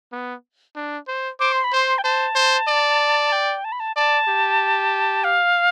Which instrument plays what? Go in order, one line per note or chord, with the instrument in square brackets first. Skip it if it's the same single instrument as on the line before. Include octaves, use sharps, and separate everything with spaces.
[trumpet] B3
D4
C5
[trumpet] C5 [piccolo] D6
[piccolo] C6
B5
[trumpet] C5 [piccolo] C6
[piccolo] G5
[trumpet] C5 [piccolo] A5
[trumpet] C5
D5
[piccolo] G5
A5
B5
A5
[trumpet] D5 [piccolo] A5
[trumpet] G4
[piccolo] F5